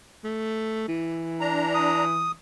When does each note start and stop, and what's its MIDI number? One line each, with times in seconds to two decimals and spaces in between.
0.24 0.86 57
0.88 2.36 52
1.40 2.04 62
1.40 2.04 82
1.74 2.32 87